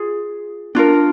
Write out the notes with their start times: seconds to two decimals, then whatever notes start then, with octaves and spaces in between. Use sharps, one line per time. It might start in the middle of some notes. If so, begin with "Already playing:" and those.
Already playing: F4 G#4
0.75 D4 F4 A#4